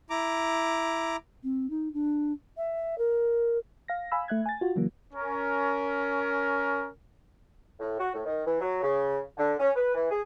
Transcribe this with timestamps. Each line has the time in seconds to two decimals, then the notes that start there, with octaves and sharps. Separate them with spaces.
0.10 E4 A#5 D6
1.44 C4
1.70 D#4
1.94 D4
2.57 E5
2.98 A#4
3.88 F5 A#6
4.12 F5 G#5 B5 E6
4.28 A3 E5 F#6 G#6
4.46 G#5 A6
4.61 F4 F#4
4.76 C#3 E3 F#3 A#3
5.14 C#4 A#4
7.80 A2
8.00 F#4
8.14 A2
8.26 D#3
8.46 E3
8.61 F#3
8.82 C#3
9.38 D3
9.59 C#4
9.76 B4
9.94 E3
10.11 G#4